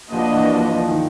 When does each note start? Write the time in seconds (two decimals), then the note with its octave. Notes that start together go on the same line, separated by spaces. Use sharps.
0.12 F3 A#3 D4 F#4 B4 D#5
0.32 E3
0.54 F3
0.75 F3
0.88 D#3